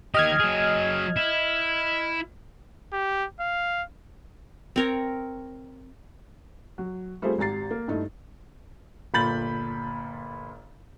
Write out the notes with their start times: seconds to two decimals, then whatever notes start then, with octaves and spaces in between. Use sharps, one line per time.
0.14 D#3 G4 D#5 F6 G#6
0.40 F#3 G#4
1.16 E4
2.93 G4
3.40 F5
4.76 C4 A#4 C#5
6.78 F#3
7.22 G3 A3 C4 F4 G#4 C5
7.38 G#1 G4 A#5 A6 C7
7.71 A#3
7.88 G2 A3 D#4 E4
9.14 G1 A#2 B5 G6 A6 F#7